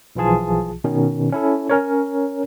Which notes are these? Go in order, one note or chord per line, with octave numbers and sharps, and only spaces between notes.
B1 E3 F3 F4 G#4 A5
B2 D#3 C#4
C#4 E4 A4
C#4 A#4 C#5